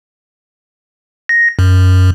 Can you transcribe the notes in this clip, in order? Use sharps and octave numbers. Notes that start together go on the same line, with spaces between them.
A#6
F#2